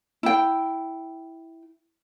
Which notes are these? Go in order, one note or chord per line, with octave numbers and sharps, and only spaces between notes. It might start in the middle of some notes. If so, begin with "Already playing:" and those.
E4 G5